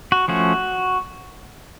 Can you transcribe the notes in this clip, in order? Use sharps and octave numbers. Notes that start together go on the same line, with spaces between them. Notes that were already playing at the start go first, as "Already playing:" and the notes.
F#4
F3 A3 C#4 F#4